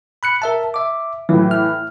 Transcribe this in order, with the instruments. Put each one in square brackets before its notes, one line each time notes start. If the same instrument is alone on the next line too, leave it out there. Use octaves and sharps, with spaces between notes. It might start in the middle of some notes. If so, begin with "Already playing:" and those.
[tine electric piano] B5 F#6 C#7
A#4 E5 A5
E5 D6
[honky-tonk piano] A2 E3 [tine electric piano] F#3
[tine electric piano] F6